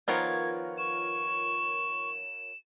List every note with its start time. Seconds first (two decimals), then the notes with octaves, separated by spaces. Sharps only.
0.08 D#3 F3 B3 F4 A#4 C#5 G#6
0.78 C#6 E7